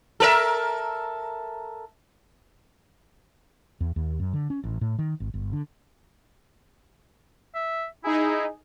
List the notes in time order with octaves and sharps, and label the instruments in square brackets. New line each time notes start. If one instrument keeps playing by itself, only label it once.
[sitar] A4 A#4 E5
[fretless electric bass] E2
D#2
F#2
D3
C#4
A1
A2
D#3
G#1
G1
D3
[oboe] E5
[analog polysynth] D#4 G#4 [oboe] E4